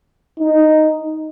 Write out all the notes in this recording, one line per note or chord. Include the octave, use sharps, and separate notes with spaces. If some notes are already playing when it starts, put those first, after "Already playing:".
D#4